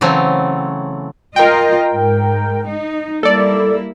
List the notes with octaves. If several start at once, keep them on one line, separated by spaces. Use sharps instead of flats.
C#3 E3 F#3 A3 C4
F4 A#4 D#5 G5
G#2
D#4
G3 A#3 E4 A4 D5